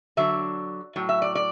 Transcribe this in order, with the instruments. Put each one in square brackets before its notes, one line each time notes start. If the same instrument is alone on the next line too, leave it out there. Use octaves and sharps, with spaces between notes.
[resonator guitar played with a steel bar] D3 F#3 D4 E5
A2 F#3
E5
D5
D5